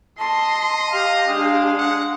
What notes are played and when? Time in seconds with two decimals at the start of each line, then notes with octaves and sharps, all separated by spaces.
0.19 D#5 A5 C6
0.92 G4 F5
1.28 G#3 D4 F5
1.78 F#5